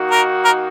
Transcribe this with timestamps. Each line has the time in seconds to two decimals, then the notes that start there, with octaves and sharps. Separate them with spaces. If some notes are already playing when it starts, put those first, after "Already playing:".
Already playing: D#3 A#3 D#4 F#4
0.11 A#4
0.45 A#4